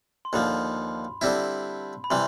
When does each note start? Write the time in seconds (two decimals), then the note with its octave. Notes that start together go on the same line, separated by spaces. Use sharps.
0.25 C6
0.33 D#2 D3 F3 B5
1.21 D3 G3 C4 E4
2.04 B5
2.10 C3 E3 G3 C6